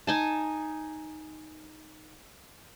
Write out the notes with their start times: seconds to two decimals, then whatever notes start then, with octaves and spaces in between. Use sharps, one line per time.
0.07 D#4 G#5 A5